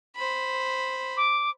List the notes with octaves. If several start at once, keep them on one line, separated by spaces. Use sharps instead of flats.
C5 B5
D6